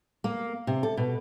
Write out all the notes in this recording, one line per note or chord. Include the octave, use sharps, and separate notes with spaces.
A#3
C3
A4
B2